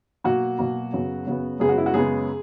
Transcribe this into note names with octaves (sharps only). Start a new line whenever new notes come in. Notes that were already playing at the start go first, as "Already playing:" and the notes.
B2 F#3 A#3 F#4
B2 F#3 A#3
F#2 C#3 F#3 B3
F#2 C#3 F#3 B3
F#2 C#3 G#3 B3 G#4
F#4
E4
F#4
F#2 C#3 G#3 B3 G#4